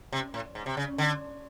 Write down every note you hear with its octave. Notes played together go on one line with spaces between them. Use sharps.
C3
A2
G#2
C3
C#3
D3